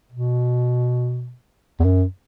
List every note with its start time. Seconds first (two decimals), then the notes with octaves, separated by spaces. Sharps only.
0.12 B2
1.80 E2
1.84 F#2